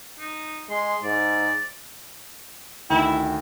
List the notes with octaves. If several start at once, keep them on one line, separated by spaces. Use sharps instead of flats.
D#4
G#3 C6
G#2 D5
D2 D#3 E4 G5 A#5